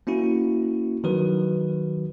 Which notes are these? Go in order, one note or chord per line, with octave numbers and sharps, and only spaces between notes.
A#3 C#4 E4 F#4
D#3 F#3 F#4 B4